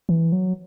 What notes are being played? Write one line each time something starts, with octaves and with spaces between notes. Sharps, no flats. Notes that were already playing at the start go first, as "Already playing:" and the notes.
E3
F#3